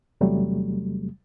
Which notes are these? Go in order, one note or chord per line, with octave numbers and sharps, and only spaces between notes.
E2 C3 F#3 G3 A3